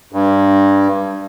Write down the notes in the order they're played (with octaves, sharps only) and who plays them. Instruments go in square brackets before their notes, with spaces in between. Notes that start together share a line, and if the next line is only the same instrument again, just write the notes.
[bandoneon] G2